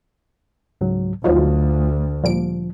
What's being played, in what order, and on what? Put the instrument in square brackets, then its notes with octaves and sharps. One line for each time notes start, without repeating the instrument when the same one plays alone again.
[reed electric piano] C#2 G#2 F#3
[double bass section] D2 [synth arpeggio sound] F3 F#3 D#4 [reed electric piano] F4
[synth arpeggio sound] A#2 G3 D7 [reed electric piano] F3